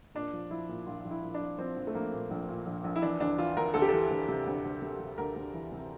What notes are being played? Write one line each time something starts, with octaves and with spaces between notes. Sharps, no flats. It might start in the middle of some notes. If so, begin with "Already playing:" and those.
A#2 D4
F3
F3 E4
A#2
A#1 F4
A#1
E4
A#1
D4
F3
F3 C4
A#1
A3
A#1 A#3
A#2
A#1
A#2
A#1
A#1
E4
E3 D4
D2 D4
E3 F4
D2 A#4
D2 A4
G4
E3 A4
D2
C3
D2
D2
C3
C3
D2 A#4
D2
E3
C3